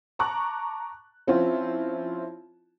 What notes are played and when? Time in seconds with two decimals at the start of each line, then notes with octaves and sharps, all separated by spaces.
0.19 A5 A#5 C#6 D6 F#6
1.27 F3 C4 C#4 E4 F4